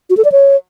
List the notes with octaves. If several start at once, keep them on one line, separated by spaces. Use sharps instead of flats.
F#4
A4
D5
C#5